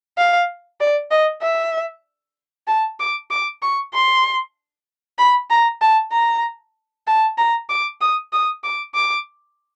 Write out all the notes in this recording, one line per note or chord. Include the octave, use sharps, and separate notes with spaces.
F5
D5
D#5
E5
A5
D6
D6
C#6
C6
B5
A#5
A5
A#5
A5
A#5
D6
D#6
D#6
D6
D6